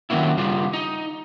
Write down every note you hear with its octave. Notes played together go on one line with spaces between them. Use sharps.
D#3 F#3 A#3 C#4 E4
C#3 G3 F4
D#4